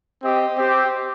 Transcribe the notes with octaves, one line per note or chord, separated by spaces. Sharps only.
C4 G4 D#5
C4 G4